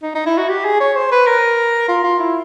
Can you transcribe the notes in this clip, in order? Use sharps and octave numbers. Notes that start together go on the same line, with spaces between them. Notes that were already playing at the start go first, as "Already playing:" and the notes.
D#4
D#4
E4
F#4
G4
G#4
C#5
C5
B4
A#4
F4
F4
E4